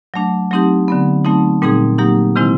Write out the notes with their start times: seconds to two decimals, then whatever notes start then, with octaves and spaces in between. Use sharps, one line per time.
0.14 F#3 A3 D4
0.51 F#3 A3 C4 D#4 G4
0.88 D3 F#3 B3
1.25 F#3 A3 C4 D#4
1.62 A#2 G3 C4 D#4 G#4
1.98 F#3 A#3 D#4 G4
2.36 C3 D#3 G#3 C4 E4